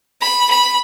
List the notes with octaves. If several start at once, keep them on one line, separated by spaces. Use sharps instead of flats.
B5
B5